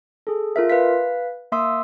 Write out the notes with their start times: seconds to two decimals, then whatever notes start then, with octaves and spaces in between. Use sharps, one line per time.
0.27 G#4 A4
0.56 F4 A#4 E5
0.70 B4 F5 B6
1.52 A#3 E5 C6 D#6 E6